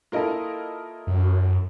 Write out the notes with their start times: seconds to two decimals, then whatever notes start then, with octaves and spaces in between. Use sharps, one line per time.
0.12 A#3 E4 F4 A4 A#4 D#5
1.07 F#2